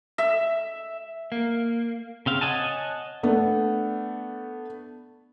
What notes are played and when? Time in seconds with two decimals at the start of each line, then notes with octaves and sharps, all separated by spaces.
0.18 E5
1.32 A#3
2.26 C#3 C4 F5
2.41 C#5 D#5 F#5 G#5 A5
3.23 A3 B3 D4